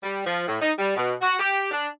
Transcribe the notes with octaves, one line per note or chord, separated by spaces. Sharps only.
G3
F3
A2
D#4
G3
B2
F#4
G4
D4